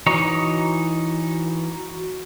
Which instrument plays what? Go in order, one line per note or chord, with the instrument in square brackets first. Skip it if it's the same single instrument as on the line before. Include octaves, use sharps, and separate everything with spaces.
[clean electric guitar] E3 D#4 C#5 [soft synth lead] F#4